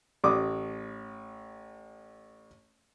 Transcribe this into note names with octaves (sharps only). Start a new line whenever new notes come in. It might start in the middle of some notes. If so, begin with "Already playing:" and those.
A1 D6 D#6